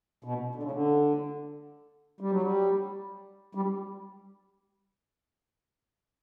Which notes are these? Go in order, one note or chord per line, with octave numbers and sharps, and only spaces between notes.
B2
D3
C#3
D3
G3
F#3
G3
G3